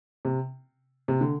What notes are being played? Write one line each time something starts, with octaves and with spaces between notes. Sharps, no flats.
C3
C3
D3